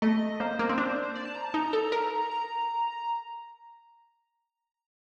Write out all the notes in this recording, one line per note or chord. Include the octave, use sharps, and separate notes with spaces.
A3 D#5
A#3 C5
A#3
C4
D4
D5
A5
A#5
A5
D#4 A#5
A4
A#4
A#5